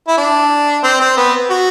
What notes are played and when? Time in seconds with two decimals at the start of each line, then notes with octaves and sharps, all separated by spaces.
0.08 E4
0.17 D4
0.83 C4
1.00 C4
1.17 B3
1.50 F#4